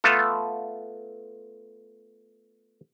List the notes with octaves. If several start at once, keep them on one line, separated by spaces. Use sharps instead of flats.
A3 B3 F4 A4